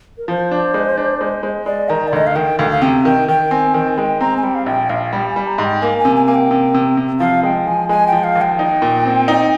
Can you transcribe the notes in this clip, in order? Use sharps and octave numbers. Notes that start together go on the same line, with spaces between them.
A#4
F3 C5
D4
G#3
D4
G#3
G#3
G#3 D5
D#3 A#5
D5
D2 D#5
F5
D#3 G5
D2 F5
F5
C3 G5
D#3 G5
D#3 G5
C4 G#5
D#3 G5
G#5
G#3 G5
C4 A#5
G#5
G3 G5
F5
A#1 G5
A#1 F5
G3 G5
G#5
G3
A#5
G#2
G5
A#3 G#5
G#5
C3
G#5
A#3 G#5
G5
C3
C3
C3
F3 F5
G#3 G5
F3 G#5
G#3 G#5
G5
F3
F5
D#2
G5
D#4
A#2
C4
D#4